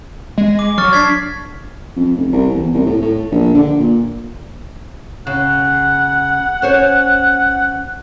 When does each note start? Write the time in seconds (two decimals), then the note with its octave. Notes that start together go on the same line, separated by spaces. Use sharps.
0.38 G#3
0.59 D6
0.78 F#3 C#6 F6 A6
0.93 D4 G#6 B6 C7
1.96 F2
2.16 F1
2.32 C2
2.54 E2
2.74 C2
2.86 A2
3.02 A2
3.32 A#1
3.55 D3
3.79 A#2
5.27 C#3 F#5
6.62 C#4 C5 C#5